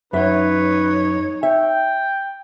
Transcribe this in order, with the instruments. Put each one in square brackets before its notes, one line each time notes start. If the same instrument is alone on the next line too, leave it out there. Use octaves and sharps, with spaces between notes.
[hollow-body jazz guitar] F#2 E5 [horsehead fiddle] D#4 C#5 [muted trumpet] B4
[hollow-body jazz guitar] E5 [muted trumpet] G5